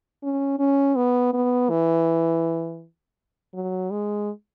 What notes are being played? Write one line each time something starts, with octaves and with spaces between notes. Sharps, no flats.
C#4
C#4
B3
B3
E3
F#3
G#3